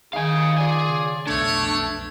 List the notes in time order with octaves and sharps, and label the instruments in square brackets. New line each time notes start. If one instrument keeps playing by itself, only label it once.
[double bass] D#3 [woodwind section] D#4 G#4 [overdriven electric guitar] F5 G#5
[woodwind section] F4 D5 [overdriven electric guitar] G#4 G#5
[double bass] C#3
[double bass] B1 F2 [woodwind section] A3 [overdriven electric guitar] D4 [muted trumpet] C#5